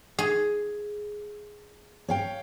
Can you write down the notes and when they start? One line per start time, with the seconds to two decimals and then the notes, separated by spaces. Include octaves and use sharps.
0.19 G#4
2.08 C#5 F5 G5